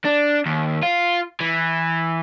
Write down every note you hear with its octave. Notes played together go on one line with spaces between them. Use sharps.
D4
D#2
F4
E3